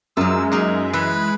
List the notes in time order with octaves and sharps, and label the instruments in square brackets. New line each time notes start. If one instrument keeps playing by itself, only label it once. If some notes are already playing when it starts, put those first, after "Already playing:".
[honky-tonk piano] F#2 [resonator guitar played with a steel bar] F3 F#3 [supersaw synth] G#3 [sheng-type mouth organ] E6
[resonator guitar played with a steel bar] A#3 D#4 G#4 [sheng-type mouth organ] E5
[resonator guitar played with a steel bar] E3 [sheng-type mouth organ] B4 B5